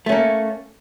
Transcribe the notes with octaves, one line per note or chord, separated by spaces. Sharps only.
A3 A#3 C#4